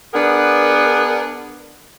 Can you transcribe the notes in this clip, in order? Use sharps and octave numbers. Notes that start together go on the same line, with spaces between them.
B3 D4 G#4 A#4 F#5